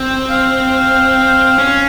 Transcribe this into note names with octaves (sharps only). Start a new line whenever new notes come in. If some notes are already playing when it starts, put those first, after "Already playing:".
Already playing: C4
F5
C#4